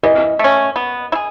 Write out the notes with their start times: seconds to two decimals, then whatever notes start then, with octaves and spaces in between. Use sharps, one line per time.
0.03 E3 D#5
0.39 A3 C#4
0.76 B3
1.12 E4
1.15 G#4